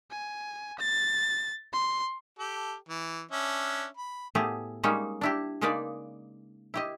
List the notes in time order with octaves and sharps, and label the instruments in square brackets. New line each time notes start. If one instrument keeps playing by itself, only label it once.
[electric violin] G#5
A6
C6
[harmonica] G4 A4
E3
C#4 D4 E5
B5
[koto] A2 A3 B3 G4 G#4
G3 G#3 A#3 C#4 D#4
D4 E4 G4
C#3 G#3 A#3 D#4 B4 D5
E4 G4 D#5